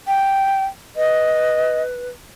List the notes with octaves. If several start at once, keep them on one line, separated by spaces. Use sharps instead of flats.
G5
B4 D#5